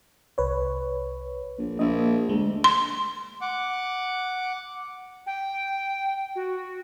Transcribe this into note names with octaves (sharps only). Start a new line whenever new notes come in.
C2 B4 C#5
A#1
A#1 D#5 E5
D2 G#3
C6
F#5 D6
G5
F#4